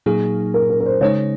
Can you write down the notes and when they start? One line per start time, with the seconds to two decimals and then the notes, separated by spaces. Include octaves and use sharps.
0.06 A#2 F#3 A#3 D#4 G#4
0.54 A#4
0.70 A#4
0.80 A#4
0.86 C5
1.01 C#3 G#3 D#4 C#5